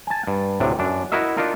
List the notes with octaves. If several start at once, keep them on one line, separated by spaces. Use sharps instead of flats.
G#5 A5
G2
D2 A2 C3 D4
F#2 D4
E4 F#4 A#4 D#5 E5
D4 D#4 F4 A#4